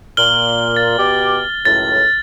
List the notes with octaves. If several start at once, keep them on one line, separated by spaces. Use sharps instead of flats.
A#2 F6 F#7 G7
A6
B2 G4 D6
C#2 F#2 A2 A6